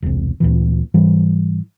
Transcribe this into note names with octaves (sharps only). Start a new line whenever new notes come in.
E1 C2
D2 A#2 E3
G#2 E3 G3